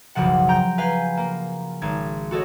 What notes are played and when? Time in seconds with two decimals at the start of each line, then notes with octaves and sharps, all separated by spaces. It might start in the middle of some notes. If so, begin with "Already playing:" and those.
0.15 F#1 B1 C#3 F3 F#5
0.48 G5 A#5 G6
0.78 B4 F5 G#5 G6
1.17 A#3
1.82 G#1 G#6
2.31 F#4 A4 C#5 D#5